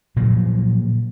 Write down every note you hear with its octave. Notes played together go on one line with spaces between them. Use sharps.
A#2 C#3 F3 F#3